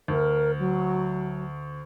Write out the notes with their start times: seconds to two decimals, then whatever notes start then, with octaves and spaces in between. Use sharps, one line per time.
0.08 D2 A#4
0.58 F#3